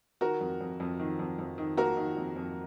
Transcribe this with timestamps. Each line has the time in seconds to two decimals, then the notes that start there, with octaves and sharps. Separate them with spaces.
0.21 D#3 F#4 A#4
0.41 F2
0.61 F2
0.80 F2
1.00 D#3
1.19 F2
1.39 F2
1.58 D#3
1.77 A#3 F#4 A#4
1.97 D#3
2.17 F2
2.36 F2